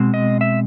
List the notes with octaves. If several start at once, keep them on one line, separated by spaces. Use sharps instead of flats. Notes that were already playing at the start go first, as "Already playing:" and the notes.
Already playing: B2 G#3 C4
D#5
E5